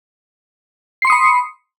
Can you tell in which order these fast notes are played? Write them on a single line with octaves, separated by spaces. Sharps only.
C7 C6 C#7 D#6 B5